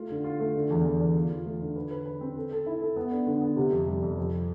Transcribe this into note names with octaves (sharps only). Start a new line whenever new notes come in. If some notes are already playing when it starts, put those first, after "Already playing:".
Already playing: A3 F4
D3
F4
A3
D3
E2
E2
E2
F4
F4
A3
D3
B4
B4
B4
C4
A4
A4
E4
A4
B3
D4
D3
B3
C3
F2
G3
F2
F3